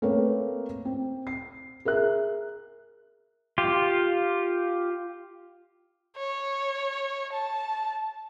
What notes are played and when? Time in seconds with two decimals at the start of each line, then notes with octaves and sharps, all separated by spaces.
0.02 A3 A#3 C4 A#4 B4 C#5
0.85 C4
1.27 C7
1.85 G#4 A#4 E5 F#6
3.58 F4 G4
6.17 C#5
7.32 A5